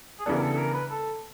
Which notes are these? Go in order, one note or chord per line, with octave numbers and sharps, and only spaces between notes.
G#4
C#3 E3 G3 B3 D4 A4
A#4
A4
A4
A#4
B4
A4